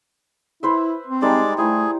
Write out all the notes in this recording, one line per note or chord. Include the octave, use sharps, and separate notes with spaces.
E4 B4 C5 E5
C4
G3 G#3 D#4 A4 D5
A3 E4 G#4 C5 A#5